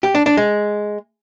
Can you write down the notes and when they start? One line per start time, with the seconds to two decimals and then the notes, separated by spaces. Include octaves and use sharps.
0.03 G4
0.15 D4
0.26 D4
0.37 G#3